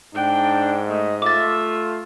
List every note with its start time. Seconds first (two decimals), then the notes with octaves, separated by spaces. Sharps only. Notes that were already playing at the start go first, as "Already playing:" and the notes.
0.15 G#2 D4 G5
0.87 A3 D#5
1.22 A3 F4 E5 D6 A6